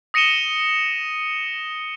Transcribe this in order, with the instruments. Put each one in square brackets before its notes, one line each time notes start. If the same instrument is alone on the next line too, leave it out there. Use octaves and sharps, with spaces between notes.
[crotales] D#6 A#6 C#7 D#7 E7 G7